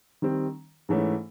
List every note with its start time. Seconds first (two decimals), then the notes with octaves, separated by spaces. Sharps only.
0.22 D#3 G3 C4
0.89 G#2 E3 A3 C#4